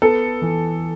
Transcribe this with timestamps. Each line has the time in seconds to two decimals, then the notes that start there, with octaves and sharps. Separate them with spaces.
0.02 B3 A4
0.42 E3